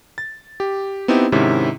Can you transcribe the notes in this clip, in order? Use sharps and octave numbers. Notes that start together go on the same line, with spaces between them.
A6
G4
B3 C4 D#4 E4 G4
G#2 C3 D#3 C#4 E4